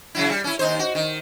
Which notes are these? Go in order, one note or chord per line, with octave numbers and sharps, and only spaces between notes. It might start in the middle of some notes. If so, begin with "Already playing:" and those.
C#3 F#3 E4
G3
C#4 E4
D#2 D#4 C5
F#4
D#3